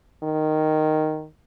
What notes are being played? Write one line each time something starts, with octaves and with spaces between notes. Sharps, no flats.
D#3